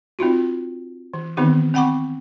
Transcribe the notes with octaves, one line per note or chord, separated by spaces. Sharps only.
C4 D#4 F4 F#4
E3
D#3 E3 B3 C4 D#4 G4
C4 F#5 G5 B5 C#6 D6